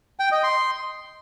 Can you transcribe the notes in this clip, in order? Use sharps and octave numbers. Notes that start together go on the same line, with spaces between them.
G5
D#5
C6